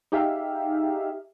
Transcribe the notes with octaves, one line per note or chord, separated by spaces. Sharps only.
D#4 G4 G#4 E5 F5